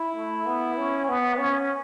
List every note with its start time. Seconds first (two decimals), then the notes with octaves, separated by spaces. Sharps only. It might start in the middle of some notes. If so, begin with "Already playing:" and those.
Already playing: E4
0.16 A3
0.46 B3
0.78 C#4
1.09 B3
1.38 C#4